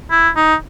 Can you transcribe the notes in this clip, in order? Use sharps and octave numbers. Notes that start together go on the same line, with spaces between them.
E4
D#4